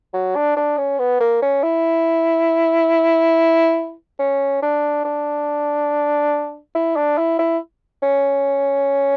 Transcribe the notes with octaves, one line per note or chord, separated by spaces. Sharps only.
F#3
D4
D4
C#4
B3
A#3
C#4
E4
C#4
D4
D4
E4
D4
E4
E4
C#4